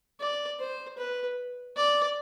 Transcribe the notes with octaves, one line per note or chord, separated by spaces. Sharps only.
D5
C5
B4
D5